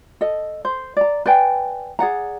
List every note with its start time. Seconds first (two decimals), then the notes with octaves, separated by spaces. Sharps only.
0.21 A4 D#5
0.65 C5
0.97 D5 A#5
1.26 B4 D5 G5 G#5
1.99 G#4 D5 F#5 A#5